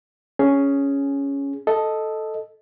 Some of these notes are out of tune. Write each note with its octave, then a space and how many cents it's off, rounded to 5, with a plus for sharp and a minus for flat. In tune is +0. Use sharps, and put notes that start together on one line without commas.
C#4 +5 G#4 +0
A4 +0 D#5 +0